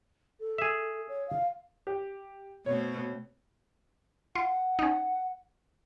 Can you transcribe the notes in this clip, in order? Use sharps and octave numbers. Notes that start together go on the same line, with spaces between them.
A4
G#4 E5
C#5
F5
G4
B2 A3 C4 C#5
F4 F#5
C#4 D#4